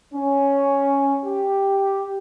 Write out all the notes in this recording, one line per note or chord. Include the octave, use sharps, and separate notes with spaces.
C#4
G4